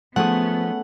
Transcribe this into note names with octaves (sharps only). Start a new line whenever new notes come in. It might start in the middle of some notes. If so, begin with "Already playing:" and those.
F3 A3 B3 C#4 G#4 F#5